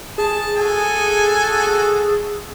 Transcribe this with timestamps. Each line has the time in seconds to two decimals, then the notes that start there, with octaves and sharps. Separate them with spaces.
0.18 G#4 A5
0.57 F#4 A4 G#5